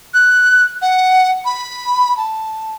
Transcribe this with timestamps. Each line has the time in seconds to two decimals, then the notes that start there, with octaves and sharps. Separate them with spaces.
0.14 F#6
0.82 F#5
1.45 B5
2.17 A5